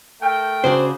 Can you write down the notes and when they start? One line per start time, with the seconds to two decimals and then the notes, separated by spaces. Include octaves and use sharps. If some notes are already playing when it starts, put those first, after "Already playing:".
0.22 A3 A#4 G5
0.64 C#3 D4 F#4 C5